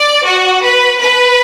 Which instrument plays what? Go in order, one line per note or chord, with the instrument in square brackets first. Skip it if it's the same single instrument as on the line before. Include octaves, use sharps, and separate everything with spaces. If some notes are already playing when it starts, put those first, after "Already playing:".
Already playing: [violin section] D5
F#4
B4
B4